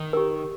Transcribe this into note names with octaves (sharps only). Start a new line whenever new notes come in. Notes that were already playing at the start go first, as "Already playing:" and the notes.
Already playing: D#3
G4 A#4